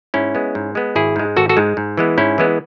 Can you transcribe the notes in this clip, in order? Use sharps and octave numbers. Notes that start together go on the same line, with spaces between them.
G#2 C#4 E4
G#3 B3
G#2
G#3 B3
G#1 E4 G#4
G#2 G#3
G#1 F#4 A4
F#4 A4
G#2 G#3
G#2
E3 G#3 B3
G#2 C#4 E4
E3 G#3 B3